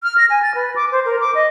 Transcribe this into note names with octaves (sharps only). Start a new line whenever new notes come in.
F6
A#6
G#5
A6
B4
D6
C5
A#4
D6
D#5